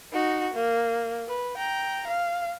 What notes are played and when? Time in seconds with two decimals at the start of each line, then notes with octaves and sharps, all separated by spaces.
0.13 D#4 F#4
0.54 A#3
1.28 B4
1.57 G5 A#5
2.07 F5